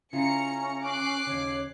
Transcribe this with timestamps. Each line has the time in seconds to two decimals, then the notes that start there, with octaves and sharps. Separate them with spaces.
0.13 C#3 C#4 E4 F4 A#5 C#7
0.84 D6 F#6 C7
1.27 D#2 C#3 C#5